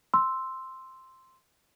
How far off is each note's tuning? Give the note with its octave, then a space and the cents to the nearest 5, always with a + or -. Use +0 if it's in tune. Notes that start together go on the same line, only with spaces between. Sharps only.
C6 +0 E6 +0